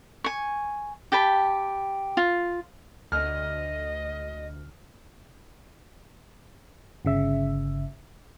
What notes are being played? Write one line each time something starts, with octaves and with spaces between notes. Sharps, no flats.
G#5 C#6
G4 G5 A5 B5
F4
D2 D#5 F6
G1 C#3 E5